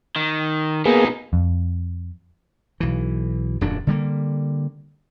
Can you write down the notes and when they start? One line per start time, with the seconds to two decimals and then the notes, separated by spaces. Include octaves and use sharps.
0.16 D#3
0.86 B2 A#3 B3 D#4 G#4
1.33 F2
2.80 B1 E3
3.61 D#1 F#2 F#3 D4
3.87 D3 G3 A#3